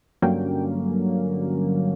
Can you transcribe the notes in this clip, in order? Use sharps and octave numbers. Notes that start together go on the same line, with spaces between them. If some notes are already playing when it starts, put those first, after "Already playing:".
G2 D3 F#3 A#3 C#4 G5